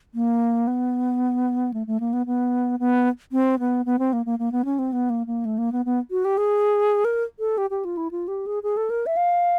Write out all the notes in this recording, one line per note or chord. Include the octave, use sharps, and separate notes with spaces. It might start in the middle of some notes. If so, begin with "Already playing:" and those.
A#3
B3
A3
A3
A#3
B3
B3
B3
C4
B3
B3
C4
A#3
A#3
A#3
B3
C#4
C4
B3
A#3
A#3
A3
A#3
B3
B3
F#4
G4
G#4
A#4
A4
G4
G4
F4
E4
F4
G4
G#4
G#4
A4
A#4
E5
F5